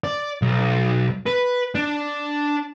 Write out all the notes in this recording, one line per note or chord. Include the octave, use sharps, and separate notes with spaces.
D5
B1
B4
D4